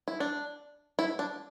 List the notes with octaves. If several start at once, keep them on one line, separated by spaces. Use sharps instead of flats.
E4
D4
E4
D4